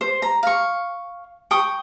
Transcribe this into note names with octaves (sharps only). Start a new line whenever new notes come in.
C5
A#5
F5 C#6
G5 C#6 D#6